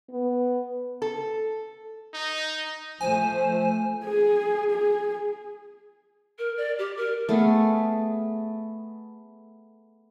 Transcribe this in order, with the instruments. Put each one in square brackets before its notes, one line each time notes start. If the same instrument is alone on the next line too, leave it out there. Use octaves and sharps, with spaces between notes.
[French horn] B3
[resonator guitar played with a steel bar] A4
[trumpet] D#4
[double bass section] F3 A3 [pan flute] C5 [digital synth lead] G#5
[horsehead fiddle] G#4
G#4
[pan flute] A#4
D5
G4
A#4
[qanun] A3 B3 G#4